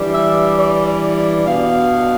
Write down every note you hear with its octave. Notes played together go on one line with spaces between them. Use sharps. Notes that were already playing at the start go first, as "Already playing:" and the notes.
Already playing: E3 G3 D4
E5
D5
B2 B3 D4 F5